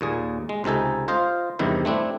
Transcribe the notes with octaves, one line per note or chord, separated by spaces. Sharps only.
D#2 A#2 G#4
G#3
C#2 C3 D#4 A4 G#5
F4 C5 D#5 F5
E2 G2 C3 D#3 E4
A3 C4 D4 E4